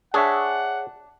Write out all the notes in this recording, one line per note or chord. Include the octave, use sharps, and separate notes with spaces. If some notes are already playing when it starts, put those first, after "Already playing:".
D4 G#4 C#5 E5 F#5